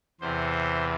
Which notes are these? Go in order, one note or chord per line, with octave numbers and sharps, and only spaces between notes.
E2 C3 E3 C5